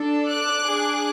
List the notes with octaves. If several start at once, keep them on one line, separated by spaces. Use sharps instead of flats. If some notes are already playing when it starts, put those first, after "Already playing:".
Already playing: D4 A4
D6 F#6
D4 G#4